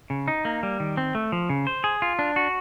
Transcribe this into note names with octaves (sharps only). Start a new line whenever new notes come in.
C#3
D#4
A#3
G3
D#3
C4
A3
F3
C#3
C5
G#4
F4
D4
F#4